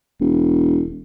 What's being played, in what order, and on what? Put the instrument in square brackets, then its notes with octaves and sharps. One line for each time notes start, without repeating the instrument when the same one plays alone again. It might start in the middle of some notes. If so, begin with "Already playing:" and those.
[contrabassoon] E1